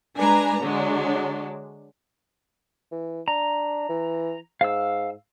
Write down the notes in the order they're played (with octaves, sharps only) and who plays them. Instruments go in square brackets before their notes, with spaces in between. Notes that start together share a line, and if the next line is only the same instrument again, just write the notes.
[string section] G#3 D4 B4 G#5 A#5
D3 F#3 G#3 D4
[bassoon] E3
[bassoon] D4 [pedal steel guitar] A#5
[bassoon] E3
[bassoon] G#2 [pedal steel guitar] F5 E6